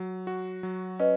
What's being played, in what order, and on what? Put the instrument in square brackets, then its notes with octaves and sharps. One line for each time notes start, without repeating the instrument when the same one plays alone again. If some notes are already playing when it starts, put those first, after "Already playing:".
Already playing: [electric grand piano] F#3
F#4
F#3
[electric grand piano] C#4 [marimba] B4 D#5